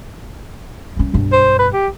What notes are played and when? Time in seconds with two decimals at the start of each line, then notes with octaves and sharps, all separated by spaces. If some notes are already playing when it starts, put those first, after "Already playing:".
0.97 G3 C#4
1.14 B1 G2
1.32 C5
1.59 B4
1.74 G4